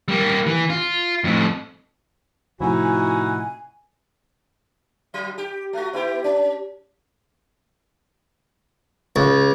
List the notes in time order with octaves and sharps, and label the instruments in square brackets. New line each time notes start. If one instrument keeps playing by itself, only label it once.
[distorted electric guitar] G3 A#3
E3
F4
F2 A2
[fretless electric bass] A2 C3 F3 [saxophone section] D#4 E4 F#4 [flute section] G#5
[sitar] F#3
G4
A3 F#4
B3 E4 G4
C#4
[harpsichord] C#2